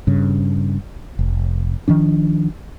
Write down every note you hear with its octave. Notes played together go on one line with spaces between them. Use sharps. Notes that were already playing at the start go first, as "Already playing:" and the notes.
G2 C#3
F1
D#3 F3 D4